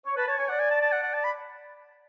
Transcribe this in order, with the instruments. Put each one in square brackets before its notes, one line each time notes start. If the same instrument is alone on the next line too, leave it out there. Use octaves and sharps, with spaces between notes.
[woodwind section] C#5
[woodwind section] B4 [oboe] A5
[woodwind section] C#5 [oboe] A5
[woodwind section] C#5 [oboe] G#5
[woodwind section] D5 [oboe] F#5
[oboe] G#5
A5
A5
F#5
F#5
A5
B5